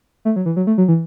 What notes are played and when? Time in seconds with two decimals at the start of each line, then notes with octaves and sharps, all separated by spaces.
0.25 A3
0.36 F#3
0.46 E3
0.56 F#3
0.67 A3
0.78 F#3
0.88 E3